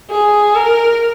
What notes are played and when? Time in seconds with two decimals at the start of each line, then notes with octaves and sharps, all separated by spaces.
0.10 G#4
0.55 A#4